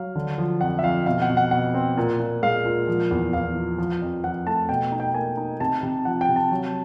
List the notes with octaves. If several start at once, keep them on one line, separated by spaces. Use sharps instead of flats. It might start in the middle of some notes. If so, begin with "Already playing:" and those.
Already playing: F#3 F5
D3
F3
F2 F#5
E5
F2 F5
B2 F5
F#5
B2
F#5
B2 F#5
C4
A#2
A#2
G#3 F5
A#2
F3
E2
E2 F5
F3
F3
F2
F3 F#5
A3 A5
B2 G5
D#4
G5
A#3 G#5
D#4
C3 A5
C3
F3 F#5
G5
C3
A5
F#3